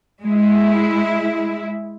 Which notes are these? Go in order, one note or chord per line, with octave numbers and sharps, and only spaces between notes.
G#3 E4